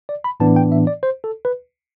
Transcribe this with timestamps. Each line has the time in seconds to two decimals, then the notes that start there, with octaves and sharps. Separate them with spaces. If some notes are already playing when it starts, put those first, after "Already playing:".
0.09 D5
0.24 B5
0.40 A2 E3 B3 D4 A5
0.56 G5
0.72 E5
0.87 D5
1.03 C5
1.24 A4
1.45 B4